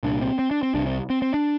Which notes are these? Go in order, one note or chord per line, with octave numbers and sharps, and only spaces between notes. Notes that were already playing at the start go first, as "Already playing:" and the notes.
C2 A#2 D4
C4
C4
D4
C4
C2 C3 D4
C4
C4
C4
D4